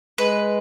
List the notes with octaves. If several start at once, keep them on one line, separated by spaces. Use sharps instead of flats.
G#3 B4